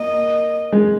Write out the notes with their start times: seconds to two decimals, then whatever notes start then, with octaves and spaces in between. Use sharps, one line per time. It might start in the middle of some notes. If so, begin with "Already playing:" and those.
Already playing: A#3 D#5
0.72 G#3